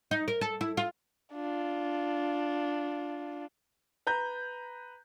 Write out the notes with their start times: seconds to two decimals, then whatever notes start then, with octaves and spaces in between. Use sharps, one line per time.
0.11 D#4
0.28 A#4
0.41 A4
0.61 E4
0.77 F4
1.34 D4 F4
4.07 B4 A#5 G6